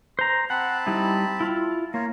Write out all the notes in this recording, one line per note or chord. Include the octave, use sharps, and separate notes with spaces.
C5 A#5
C4 F#5 A5 B5
G3 D#4 E4
E4 F4
A#3 F4 C#5